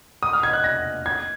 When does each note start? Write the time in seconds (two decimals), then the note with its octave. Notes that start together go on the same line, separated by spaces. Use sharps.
0.23 D#6
0.33 F6
0.43 G#6
0.53 F#6
0.64 A#6
1.06 G#6